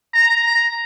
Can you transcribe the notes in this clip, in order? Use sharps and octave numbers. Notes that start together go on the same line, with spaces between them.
A#5